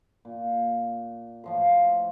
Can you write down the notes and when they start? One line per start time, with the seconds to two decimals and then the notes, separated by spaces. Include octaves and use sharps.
0.25 A#2
1.44 A2 F3 C6